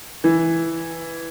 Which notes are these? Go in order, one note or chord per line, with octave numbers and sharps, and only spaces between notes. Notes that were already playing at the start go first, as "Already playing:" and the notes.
E3